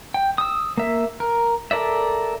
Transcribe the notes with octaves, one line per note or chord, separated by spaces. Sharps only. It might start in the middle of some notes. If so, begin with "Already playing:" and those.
G5
D#6 E6
A#3 E5
A#4
A4 A#4 D5 E5